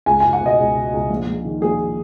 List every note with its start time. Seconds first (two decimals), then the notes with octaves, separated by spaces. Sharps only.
0.06 C#2 G#5
0.20 C#2 G#5
0.33 F#5
0.41 B2 D#5
0.59 C#2
0.75 B2
0.92 C#2
1.10 A#1
1.26 A#1
1.44 D#3
1.61 A#1 G#4